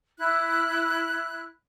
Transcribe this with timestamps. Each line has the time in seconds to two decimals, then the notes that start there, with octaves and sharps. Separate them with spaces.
0.18 E4 F#6